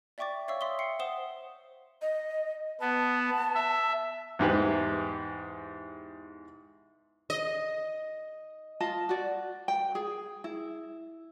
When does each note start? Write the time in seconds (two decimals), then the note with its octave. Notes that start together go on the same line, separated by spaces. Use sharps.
0.18 D5 E5 G5 C#6 D6 A6
0.48 C#5 E5 F5 C#6 E6
0.61 E5 C6 D#6 G7
0.79 G5 C7 C#7
0.99 C5 F#5 D#6 E7 G7
2.02 D#5
2.81 B3 A5
3.55 E5
4.39 E2 G#2 G4 B4
7.30 D#5
8.80 F4 D#5 A5
9.09 F#4 D5
9.68 G5
9.95 G#4
10.44 E4